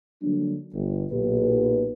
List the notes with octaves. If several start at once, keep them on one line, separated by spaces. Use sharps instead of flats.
D3 F#3 G3 A#3 D4
G1
B1 A#2 G4 B4